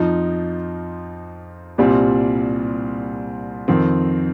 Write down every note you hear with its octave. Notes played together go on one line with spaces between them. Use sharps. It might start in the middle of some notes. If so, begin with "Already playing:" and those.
Already playing: F2 F3 D#4
C2 A#2 G3 C4
F2 D#3 C4